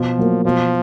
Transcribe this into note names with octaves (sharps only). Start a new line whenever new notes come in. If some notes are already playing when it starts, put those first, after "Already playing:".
Already playing: B2 F3
F#3 A#3
B2 F3